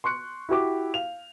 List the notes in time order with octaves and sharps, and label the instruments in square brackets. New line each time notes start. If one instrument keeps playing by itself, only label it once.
[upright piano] C6 C#6 F#6 C#7
E4 F#4 G4 D6
F5 F7